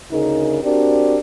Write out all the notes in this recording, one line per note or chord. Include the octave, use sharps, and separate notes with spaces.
D2 C#3 D#4 G#4 A#4
C4 D4 F#4 G4 A#4 D5